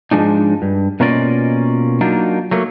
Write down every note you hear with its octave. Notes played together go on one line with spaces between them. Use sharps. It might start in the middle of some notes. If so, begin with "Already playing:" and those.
G#2 F3 G#3 D4 D#4
G2
B2 A#3 C#4 F4 D5 D#5
F#3 A#3 D4 D#4 F4
F#3 A3 A#3